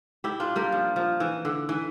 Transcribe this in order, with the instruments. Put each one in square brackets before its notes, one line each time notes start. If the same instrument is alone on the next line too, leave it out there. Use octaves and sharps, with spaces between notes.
[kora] E4 G4
D4 F4
G3 A#3
F3
F3
E3
D3
E3